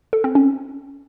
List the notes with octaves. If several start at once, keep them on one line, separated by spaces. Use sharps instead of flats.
A4
C4
C#4